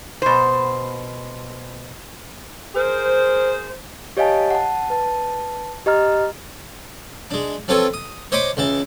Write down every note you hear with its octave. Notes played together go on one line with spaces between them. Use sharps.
B2 C5
G#4 A#4 C5
G4 C#5 D#5 F5 G#5 A5
F#5 A5
B4 A5
G4 D#5 A#5 F6
G#3 D4
F3 C4 F4 A4 B4 C#5
D#6
C5 C#5 D#5 B5 C#6 D6
C#2 E3 A5